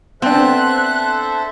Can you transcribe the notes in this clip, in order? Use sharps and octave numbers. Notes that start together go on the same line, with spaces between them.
B3 C4 D4 A4 C5 E5 F#6